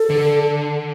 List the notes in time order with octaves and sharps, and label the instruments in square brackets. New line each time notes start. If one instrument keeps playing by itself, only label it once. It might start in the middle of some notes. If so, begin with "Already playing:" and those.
Already playing: [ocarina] A4
[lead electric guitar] D3